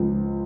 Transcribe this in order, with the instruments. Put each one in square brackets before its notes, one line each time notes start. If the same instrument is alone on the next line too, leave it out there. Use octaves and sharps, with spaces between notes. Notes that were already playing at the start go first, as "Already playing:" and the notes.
Already playing: [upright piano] C#2 F3